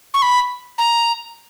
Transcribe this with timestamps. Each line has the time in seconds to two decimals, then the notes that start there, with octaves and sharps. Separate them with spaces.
0.14 C#6
0.22 B5
0.78 A#5